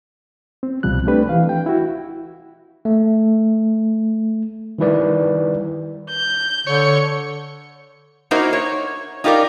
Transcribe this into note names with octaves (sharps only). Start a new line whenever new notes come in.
C4
C2 B2 F3 G3 F#6
A3 C4 D4 G4 B4
E3 F5
G5
E4 F#4
A3
D#3 G3 E4 B4 D5
G6
D3 C#5
A#3 D#4 E4 F#4 A#4 C5
C#5
D#4 F4 G4 A#4 D5